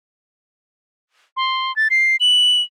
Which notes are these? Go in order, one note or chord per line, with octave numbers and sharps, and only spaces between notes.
C6
A6
C7
F#7